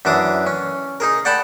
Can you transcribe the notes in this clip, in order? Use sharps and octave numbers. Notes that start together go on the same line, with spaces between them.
F#2 E3 D4 D6 D#6
C#4
D#4 G#4 A#4
D5 F#5 G5 A5 B5